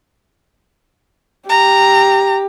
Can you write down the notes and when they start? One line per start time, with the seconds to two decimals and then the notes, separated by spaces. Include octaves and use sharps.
1.50 G4 A#5